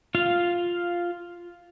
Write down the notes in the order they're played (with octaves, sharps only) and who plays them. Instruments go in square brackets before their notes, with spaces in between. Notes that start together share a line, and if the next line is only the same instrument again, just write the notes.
[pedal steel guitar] F4 F5